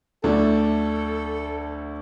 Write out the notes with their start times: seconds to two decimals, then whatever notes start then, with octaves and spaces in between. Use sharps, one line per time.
0.24 D2 D3 A3 D4 A4